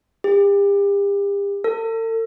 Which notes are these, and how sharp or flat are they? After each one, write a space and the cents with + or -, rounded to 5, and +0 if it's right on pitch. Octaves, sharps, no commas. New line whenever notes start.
G4 +40
A4 +45